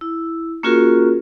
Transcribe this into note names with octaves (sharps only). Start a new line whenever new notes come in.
E4
A#3 C#4 F4 F#4 G#4 A#4